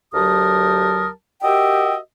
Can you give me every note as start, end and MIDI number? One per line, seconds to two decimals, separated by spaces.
0.14 1.08 38
0.14 1.08 54
0.14 1.08 67
0.14 1.08 70
0.14 1.08 81
0.14 1.08 87
1.43 1.96 66
1.43 1.96 67
1.43 1.96 70
1.43 1.96 75
1.43 1.96 76
1.43 1.96 79